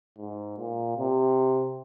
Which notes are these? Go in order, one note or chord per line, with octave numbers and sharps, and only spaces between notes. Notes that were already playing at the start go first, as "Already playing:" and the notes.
G#2
A#2
C3